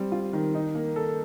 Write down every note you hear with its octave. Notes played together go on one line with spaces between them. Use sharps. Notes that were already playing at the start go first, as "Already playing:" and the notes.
Already playing: G3 C4
F4
D#3
D#4
A#3
A4